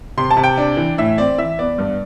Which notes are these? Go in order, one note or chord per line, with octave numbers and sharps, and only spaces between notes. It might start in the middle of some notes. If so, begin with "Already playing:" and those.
C3 C6
A5
C3
G5
D4
E3
A2 E5
C4 D5
E3 E5
B3 D5
G2